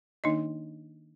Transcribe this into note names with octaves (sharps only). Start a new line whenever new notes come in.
D#3 A#3 D4 D#4 D#5